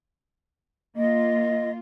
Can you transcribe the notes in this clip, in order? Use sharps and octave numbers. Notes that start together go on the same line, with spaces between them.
A#3 F4 D#5